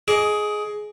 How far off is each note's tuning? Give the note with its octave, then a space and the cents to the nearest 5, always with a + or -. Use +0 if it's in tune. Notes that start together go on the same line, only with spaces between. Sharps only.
G#4 +15 D#5 +0 D6 -10